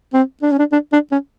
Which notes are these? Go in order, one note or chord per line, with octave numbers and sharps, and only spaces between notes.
C4
D4
C#4
D4
D4
D4
C#4